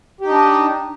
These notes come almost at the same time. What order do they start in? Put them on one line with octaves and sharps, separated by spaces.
G4 D#4 D4